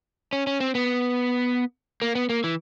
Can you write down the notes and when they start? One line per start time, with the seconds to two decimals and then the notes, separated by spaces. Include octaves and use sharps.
0.33 C#4
0.47 C#4
0.60 C4
0.75 B3
2.02 A#3
2.15 B3
2.29 A#3
2.44 E3